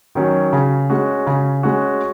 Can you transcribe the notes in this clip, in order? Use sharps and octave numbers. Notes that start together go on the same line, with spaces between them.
D#3 F#3 C#4
C#3
G#3 C#4 F#4
C#3
G#3 C#4 F#4